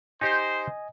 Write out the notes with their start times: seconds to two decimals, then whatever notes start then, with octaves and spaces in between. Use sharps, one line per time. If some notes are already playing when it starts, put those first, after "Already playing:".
0.21 D#4 G4 C5 D#5 G#5